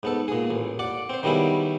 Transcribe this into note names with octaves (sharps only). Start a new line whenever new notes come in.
G#2 B3 A4
A#2 G#4
A1
D5 F#5 D6
C4 C5
D#3 F#3 G3 B3 E4 G#4